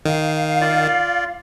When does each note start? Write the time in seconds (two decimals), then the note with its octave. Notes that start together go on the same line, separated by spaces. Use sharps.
0.05 D#3 F5
0.61 F4 D5